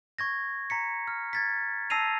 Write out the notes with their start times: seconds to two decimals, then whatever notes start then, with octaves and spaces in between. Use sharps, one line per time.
0.18 C#6 G#6 A#6
0.70 A#5 B6 C#7
1.08 F6
1.33 G#6 A6 B6
1.90 A5 E6 A#6 C7 D#7 F7